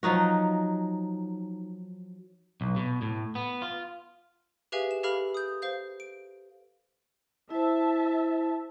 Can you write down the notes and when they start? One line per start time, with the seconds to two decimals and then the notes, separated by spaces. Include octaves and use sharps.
0.03 F3 F#3 D#4 F#4
2.61 B1
2.76 B2
3.02 A2
3.35 B3
3.62 F4
4.72 G4 G#4 B4 E5 F5 G#5
4.91 E7
5.03 G4 A4 B4 F5 B5 F6
5.34 D#6 G6
5.62 C5 F5 G6
6.00 D7
7.50 E4 C5 E5 A5